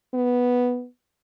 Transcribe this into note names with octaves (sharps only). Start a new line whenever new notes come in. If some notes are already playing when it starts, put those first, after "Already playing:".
B3